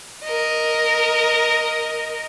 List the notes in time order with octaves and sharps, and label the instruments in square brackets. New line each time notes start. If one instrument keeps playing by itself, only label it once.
[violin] A#4 D#5